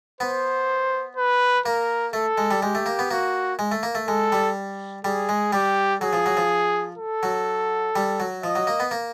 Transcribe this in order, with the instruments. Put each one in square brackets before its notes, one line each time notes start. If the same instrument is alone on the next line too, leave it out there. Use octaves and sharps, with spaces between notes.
[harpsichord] B3 [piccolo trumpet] C5
[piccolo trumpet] B4
[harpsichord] A#3 [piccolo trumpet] A#4
[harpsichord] A3 [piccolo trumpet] A4
[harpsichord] G#3
G3
[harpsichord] G#3 [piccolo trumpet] G4
[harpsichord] A3
A#3
B3
[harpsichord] A#3 [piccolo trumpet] F#4
[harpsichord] G#3
A3
A#3
A3
[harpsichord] G#3 [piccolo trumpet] A4
[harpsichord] G3
[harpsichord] G3 [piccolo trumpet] G#4
[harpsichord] G#3
[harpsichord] G3 [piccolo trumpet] G4
[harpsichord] F#3 [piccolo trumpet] G#4
[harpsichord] F3
F#3
F3
[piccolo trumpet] A4
[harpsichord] F#3
G3
F#3
[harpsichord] F3 [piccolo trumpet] D#5
[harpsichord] F#3
A#3
B3
A#3